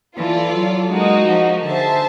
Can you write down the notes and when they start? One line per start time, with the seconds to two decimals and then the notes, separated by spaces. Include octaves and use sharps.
0.17 E3 F4 A4 D5
0.54 F#3
0.91 G#3 A#3 D#4 F#4
1.28 F3
1.65 D3 G#4 C5 E5 A5